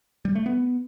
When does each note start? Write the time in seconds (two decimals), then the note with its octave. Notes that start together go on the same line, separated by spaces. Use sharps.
0.25 G3
0.35 A3
0.46 B3